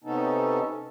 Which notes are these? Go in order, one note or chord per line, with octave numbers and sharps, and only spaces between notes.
C3 B3 C#4 D#4 A4